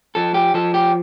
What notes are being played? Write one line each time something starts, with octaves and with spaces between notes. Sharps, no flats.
F3 A4
G4
F3 A4
G4